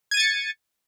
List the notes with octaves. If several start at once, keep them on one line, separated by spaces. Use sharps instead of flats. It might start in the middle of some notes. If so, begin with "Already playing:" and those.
G#6 A6 C#7 D#7